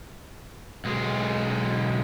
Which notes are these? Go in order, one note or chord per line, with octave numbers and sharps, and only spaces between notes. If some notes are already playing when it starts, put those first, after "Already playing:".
B1 G#3